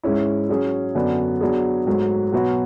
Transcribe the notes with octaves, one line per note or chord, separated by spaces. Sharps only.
G#2 G#3 C#4 E4
F#3 C#4 G#4
F#2 D3 F#3 B3 D4
F#3 B3 D4 G#4
G#2 F#3 A3
B2 F#3 B3 F#4